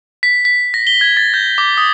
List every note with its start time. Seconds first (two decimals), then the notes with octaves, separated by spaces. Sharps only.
0.23 B6
0.45 B6
0.74 A#6
0.87 G7
1.01 G#6
1.17 A6
1.34 G6
1.58 D6
1.77 D#6